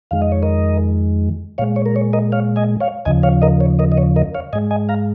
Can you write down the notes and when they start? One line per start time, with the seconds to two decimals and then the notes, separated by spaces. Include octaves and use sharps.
0.11 F2 D#3 G#3 F5
0.22 D#5
0.32 C#5
0.43 A#4 D#5
1.58 A#2 G#3 C#5 F5
1.76 C#5
1.86 A#4
1.96 C#5
2.13 A#4 D#5
2.32 C#5 F5
2.56 D#5 G#5
2.80 C#5 F5
3.05 D#2 C#3 F3 D#5 G#5
3.23 C#5 F5
3.42 A#4 D#5
3.61 C#5
3.79 A#4 D#5
3.92 D#5
3.97 C#5
4.16 A#4 D#5
4.35 C#5 F5
4.53 G#2 G#3 D#5 G#5
4.71 D#5 G#5
4.89 F5 A#5